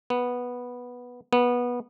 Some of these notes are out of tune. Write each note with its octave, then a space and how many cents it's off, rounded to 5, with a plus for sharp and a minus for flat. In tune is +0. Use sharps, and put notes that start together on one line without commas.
B3 -5
B3 -15